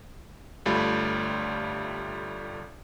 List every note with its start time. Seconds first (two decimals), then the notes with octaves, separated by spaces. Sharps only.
0.66 G1 G3 A3 F4 B5